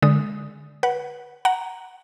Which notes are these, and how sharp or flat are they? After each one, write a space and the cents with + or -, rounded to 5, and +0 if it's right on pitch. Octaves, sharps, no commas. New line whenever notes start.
D3 +0 G#3 +0 D#6 +0
B4 -25 F#5 +0
F#5 +0 A#5 +0